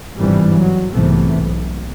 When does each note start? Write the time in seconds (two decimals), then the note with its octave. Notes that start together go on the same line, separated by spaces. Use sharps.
0.16 G1 G#2 C3 E3 F3 G3
0.50 F#3
0.91 B1 G#2 C3 E3 A3 B3
1.35 B1